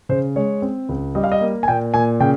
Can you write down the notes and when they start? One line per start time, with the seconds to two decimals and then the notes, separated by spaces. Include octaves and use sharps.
0.09 C#3 C5
0.36 G#3 C#5
0.62 C4
0.89 C#2
1.15 G3 D#5
1.24 F5
1.32 D#5
1.41 A#3
1.63 G#5
1.68 A#2 G5
1.94 A#2 G#5
2.20 C#3 G5